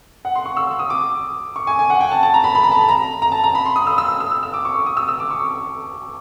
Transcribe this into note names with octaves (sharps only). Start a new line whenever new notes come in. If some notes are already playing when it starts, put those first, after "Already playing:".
F#5
C6
C#6
E6
D#6
D6
C#6
G#5
G#5
F#5
G5
A5
A5
A#5
B5
B5
A#5
A5
B5
A#5
A#5
A5
A#5
B5
C6
D#6
E6
E6
E6
E6
E6
D6
C#6
D#6
E6
E6
D6
C#6